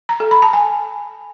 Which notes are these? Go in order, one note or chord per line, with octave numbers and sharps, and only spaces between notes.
A#5
A4
B5
A5
G#5